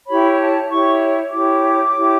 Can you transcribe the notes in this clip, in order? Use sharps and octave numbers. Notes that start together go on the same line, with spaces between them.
E4 G4 C#5 B5
A5
E4 G4 C#5 C#6
E4 G4 C#5 D6
E4 G4 C#5